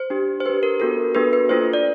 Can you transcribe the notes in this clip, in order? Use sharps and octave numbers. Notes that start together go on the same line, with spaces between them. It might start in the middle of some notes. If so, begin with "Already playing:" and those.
Already playing: C5
D4 G4
C5
D4 G4 B4
A#4
B3 D4 F#4 A4 A#4
B3 D4 F#4 A4 B4
B4
A#3 D4 F4 A4 C5
D5